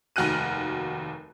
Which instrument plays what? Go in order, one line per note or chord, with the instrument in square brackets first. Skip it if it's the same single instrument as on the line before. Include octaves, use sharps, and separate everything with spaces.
[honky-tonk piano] F1 D#2 F#4 F6 F#6 D#7